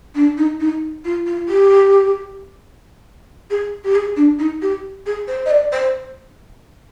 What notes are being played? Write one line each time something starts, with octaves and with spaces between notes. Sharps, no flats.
D4
D#4
D#4
F4
F4
G4
G#4
G4
G#4
D4
D#4
G4
G#4
C5
D#5
D5
C5